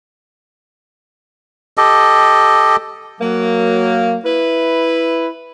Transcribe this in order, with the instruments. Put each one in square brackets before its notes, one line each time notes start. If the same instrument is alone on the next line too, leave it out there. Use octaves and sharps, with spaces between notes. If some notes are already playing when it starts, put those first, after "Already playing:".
[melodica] G4 A4 D#5
[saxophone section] F#3 A#3
E4 B4